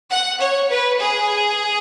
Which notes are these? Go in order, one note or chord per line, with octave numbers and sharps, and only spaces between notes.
F#5
C#5
B4
G#4